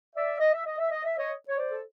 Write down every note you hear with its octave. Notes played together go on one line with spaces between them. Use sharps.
D5 E5
D#5
E5
D#5
E5
D#5
E5
C#5 D#5
C#5
C5 D5
A4